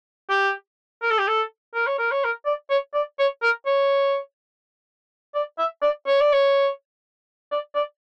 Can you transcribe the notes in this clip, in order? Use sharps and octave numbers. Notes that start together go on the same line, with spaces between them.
G4
A#4
A4
G4
A4
A#4
C#5
A#4
C#5
A#4
D5
C#5
D5
C#5
A#4
C#5
D5
E5
D5
C#5
D5
C#5
D5
D5